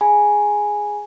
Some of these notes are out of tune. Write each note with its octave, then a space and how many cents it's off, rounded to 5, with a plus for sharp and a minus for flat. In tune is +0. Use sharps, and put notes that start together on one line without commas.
G#4 +0 G#5 +0 B5 -35